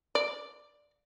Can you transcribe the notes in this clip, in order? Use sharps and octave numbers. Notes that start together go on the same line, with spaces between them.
D5